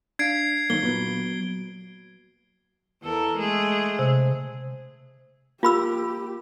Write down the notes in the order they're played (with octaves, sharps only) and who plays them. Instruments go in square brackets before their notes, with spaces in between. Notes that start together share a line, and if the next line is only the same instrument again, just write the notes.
[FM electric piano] D4 F5 B6 [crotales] G#6 C7 D7
[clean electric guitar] F#2 D#3 A#3 [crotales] G7
[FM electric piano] A#2 B3 B4 [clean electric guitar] F#3
[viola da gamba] E2 A4 A#4
G#3 A3 G#4
[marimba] C3
[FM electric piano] A#3 [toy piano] F4 B5 E6 [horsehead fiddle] G4